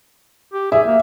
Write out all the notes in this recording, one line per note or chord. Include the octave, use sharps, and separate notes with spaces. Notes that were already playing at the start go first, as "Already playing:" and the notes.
G4
G#4 E5
A#3